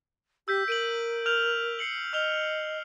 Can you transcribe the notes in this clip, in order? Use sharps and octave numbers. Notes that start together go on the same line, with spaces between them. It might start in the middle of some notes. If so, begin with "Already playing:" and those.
G4 E6 G6 B6
A#4 D7 D#7 F#7
F6 G6 F7
C7 C#7 F#7
D#5 F6 F7 G7